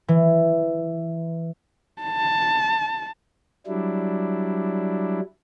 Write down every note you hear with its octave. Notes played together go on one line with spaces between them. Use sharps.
E3
A5
F#3 G3 D4 E4